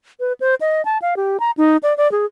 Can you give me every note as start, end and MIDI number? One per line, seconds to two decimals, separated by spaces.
0.20 0.33 71
0.40 0.55 72
0.61 0.84 75
0.85 0.98 81
1.02 1.15 77
1.17 1.40 67
1.40 1.51 82
1.57 1.77 63
1.83 1.96 74
1.98 2.10 74
2.12 2.26 68